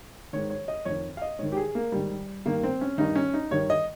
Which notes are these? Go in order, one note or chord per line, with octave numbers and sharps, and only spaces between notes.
G#2 D#3 C#5
C#5
D#5
F2 D#3 C#5
F5
D#5
G#2 D#3 C#5
G4
G#4
A#3
G#2 D#3 G3
G2 D#3 A#3
C4
C#4
G2 D#3 D#4
C#4
D#4
G2 D#3 C#5
D#5